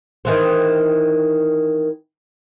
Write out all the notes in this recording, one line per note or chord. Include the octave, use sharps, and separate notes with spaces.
D#3 E3 C4